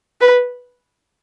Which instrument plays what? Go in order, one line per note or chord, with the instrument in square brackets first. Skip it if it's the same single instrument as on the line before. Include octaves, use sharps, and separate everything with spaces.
[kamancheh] B4